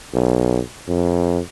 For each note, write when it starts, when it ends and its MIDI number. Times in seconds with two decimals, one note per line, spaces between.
0.14 0.60 35
0.88 1.39 41